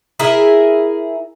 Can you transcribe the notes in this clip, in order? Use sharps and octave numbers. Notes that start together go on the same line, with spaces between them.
E4 G#4 A#4 E5